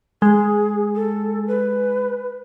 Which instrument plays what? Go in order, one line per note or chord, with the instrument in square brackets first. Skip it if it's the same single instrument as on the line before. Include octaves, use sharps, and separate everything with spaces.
[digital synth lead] G#3 [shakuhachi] G#4
[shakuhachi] A4
B4